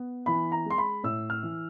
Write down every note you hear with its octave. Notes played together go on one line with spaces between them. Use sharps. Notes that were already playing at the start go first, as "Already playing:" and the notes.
Already playing: B3
E3 B5
A#5
G#3 C6
B5
A2 E6
F6
E3